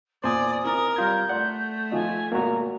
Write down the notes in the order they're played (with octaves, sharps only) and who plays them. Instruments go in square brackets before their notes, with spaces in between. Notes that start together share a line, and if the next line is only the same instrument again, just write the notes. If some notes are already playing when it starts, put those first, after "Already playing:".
[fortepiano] E2 A#2 [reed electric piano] C5 G#5 [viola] D5 [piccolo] D#6
[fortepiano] C3 E4 [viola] A#4
[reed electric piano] G3 F4 G#6 [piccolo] G6
[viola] A3 [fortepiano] D5 C6 [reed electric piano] F#5
[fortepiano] F3 F4 D#5 [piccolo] G#5
[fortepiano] G#1 B2 [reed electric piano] A#3 F#4 [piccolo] A#5